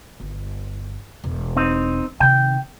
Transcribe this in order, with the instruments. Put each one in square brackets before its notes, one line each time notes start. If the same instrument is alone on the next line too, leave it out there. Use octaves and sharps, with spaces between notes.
[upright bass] G1
E1
[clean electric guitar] C4 D#4
[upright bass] C3 D#3 [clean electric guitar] G5